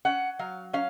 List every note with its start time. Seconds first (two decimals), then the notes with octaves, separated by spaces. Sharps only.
0.05 C#4 F#5
0.39 F#3 F5
0.73 C#4 F5